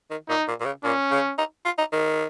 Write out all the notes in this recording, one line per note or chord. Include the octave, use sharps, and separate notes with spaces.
D#3
A#2 D#4
A#2
A#2
C#3
A#2 C#4
C#3
D#4
F4
D#4
D#3